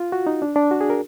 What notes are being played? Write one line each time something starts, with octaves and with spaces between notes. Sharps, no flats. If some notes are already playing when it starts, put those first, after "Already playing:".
Already playing: F4
F#4
D#4
D4
D4
F#4
G#4
A#4